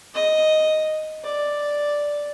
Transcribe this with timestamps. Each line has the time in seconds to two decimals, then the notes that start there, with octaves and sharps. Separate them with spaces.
0.14 D#5
1.24 D5